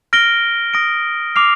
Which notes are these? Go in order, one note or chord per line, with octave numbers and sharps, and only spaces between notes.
F6 A#6 D7 G7
D#6 A#6 D7
D6 F6 C7 F7